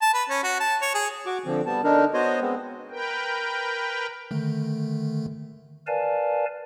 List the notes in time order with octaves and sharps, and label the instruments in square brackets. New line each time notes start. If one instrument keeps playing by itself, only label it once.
[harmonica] A5
B4
C#4
F#4
A5
C#5
G#4
[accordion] F#4 C#6 D6
D3 F3 C4
G3 B3 A5
D3 D4 D#4 A#4
B3 F#4 C5 C#5 D#5
G#3 B3 C4
[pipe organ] A#4 B4 G5
[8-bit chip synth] D3 D#3 A3
[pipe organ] A#4 B4 D5 F5 G#5 A5